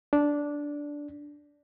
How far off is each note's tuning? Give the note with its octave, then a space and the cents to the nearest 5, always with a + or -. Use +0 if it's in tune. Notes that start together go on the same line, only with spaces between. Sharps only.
D4 -10